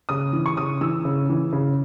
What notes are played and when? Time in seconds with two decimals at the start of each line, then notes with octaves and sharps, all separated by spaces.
0.09 C#3 D#6
0.33 E3
0.46 C#6
0.57 C#3 D#6
0.81 E3 E6
1.05 C#3
1.29 E3
1.53 C#3